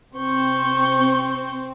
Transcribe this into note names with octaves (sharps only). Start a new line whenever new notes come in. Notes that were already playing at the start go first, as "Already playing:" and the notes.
C3 C4 C#6 G6